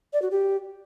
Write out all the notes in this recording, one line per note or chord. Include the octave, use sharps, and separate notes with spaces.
D5
F#4
G4